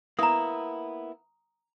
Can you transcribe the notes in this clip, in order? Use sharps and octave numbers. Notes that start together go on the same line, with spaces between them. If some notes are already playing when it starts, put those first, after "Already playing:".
A#3 B3 E4 A#5 D#6